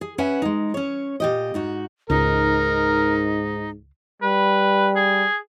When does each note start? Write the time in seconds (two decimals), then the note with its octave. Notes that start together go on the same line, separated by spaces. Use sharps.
0.01 G#4
0.18 C#4 B4 E5 F#5 G#5
0.42 G#3 D#4
0.74 C#4 C#5
1.20 A#2 G4 D#5
1.54 G#2 D#4 F#4
2.10 C#2 G#2 D#4 A#4
4.22 G3 B4
4.96 G#4